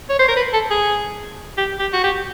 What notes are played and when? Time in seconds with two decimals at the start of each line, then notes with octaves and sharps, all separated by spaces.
0.09 C#5
0.19 C5
0.28 A#4
0.36 B4
0.53 A4
0.71 G#4
1.58 G4
1.79 G4
1.93 F#4
2.04 G4